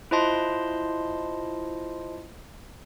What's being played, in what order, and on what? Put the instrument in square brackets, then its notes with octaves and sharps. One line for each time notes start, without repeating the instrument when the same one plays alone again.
[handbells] E4 F4 C5 D#5 A5 C6